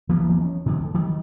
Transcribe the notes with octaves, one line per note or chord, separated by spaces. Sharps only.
C2 E3 A#3 B3
E1 E3
C#4
B2 D3 D#3 G3
D2
D#3 F#3 G3